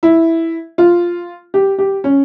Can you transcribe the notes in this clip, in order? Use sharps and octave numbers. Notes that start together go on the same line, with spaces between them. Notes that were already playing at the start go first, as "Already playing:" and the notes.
E4
F4
G4
G4
C#4